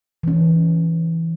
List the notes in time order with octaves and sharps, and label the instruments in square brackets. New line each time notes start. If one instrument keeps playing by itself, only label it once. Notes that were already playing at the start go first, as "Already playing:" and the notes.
[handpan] E3 C#4